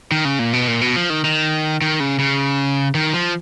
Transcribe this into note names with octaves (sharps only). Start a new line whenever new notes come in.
D#3
C#3
A#2
B2
A#2
B2
F3
D#3
D#3
D#3
C#3
C#3
D#3
F3